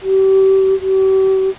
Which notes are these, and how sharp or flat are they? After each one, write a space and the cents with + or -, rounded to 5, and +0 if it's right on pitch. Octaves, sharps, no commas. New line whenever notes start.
G4 -35
G4 -45